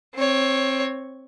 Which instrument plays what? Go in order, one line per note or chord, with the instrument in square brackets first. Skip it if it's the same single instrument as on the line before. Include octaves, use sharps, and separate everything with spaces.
[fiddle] C4 C#5